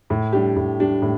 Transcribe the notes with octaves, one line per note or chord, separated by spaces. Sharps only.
A2
G3 D4 G4
A2
G3 D4 G4
A2